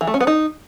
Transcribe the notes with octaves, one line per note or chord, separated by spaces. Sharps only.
E3
A3
C#4
B3
D#4